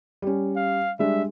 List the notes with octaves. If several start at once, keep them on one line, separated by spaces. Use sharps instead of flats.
G3 C#4
F5
G3 G#3 D4 E5